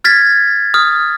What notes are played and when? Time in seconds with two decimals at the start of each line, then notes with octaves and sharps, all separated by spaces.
0.04 F6 G#6 A6 B6
0.74 D#6 F6